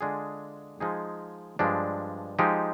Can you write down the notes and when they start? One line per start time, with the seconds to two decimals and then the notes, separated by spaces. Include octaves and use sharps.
0.01 D3 G#3 D4 F4 G#4
0.80 F3 G#3 D#4 G#4
1.59 G2 F3 G#3 D4
2.39 F3 G#3 D#4 G4